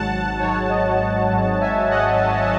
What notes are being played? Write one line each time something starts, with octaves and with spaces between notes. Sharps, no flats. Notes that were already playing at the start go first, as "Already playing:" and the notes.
Already playing: G#1 G#2 F#3 F#5 A5
G#1 G#2 F#3 C#5
D#5
D#5
G#1 G#2 F#3
E5 G#5
D#5 F#5